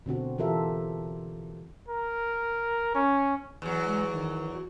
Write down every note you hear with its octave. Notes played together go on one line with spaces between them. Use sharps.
B2 D3 C4 F#4
E3 F4 G4 A4 A#4 E5
A#4
C#4
E2 F#3
G#3
D#3
F#4